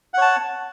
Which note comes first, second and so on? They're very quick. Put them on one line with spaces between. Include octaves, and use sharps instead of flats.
F#5 C#5 A5